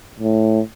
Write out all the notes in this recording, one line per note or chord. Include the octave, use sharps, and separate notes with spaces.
A2